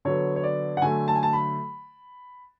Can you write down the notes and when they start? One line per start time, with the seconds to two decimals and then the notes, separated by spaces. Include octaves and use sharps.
0.05 D3 F#3 B3 C#5
0.36 C#5
0.43 D5
0.77 F#5
0.82 D3 F#3 A3 G#5
1.08 A5
1.15 G#5
1.23 A5
1.33 B5